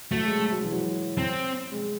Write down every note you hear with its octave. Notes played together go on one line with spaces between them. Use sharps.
F#3 A3
G#3
G#3
F#3
E3
F#3
C4
G#3